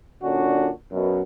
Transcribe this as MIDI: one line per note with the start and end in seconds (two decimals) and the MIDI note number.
0.23 0.69 46
0.23 0.69 50
0.23 0.69 61
0.23 0.69 62
0.23 0.69 66
0.92 1.21 42
0.92 1.21 47